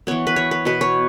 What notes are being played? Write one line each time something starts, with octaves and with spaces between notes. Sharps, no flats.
E3 B3 C#5
B4
C#5
B4
B2 B3 B4
C#5